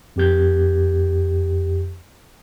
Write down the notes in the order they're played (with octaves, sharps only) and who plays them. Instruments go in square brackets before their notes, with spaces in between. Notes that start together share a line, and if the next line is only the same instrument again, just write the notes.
[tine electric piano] F2 G4 G6